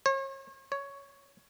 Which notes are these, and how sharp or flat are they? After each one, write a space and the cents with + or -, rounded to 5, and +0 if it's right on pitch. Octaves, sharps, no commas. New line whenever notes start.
C#5 -40
C#5 +10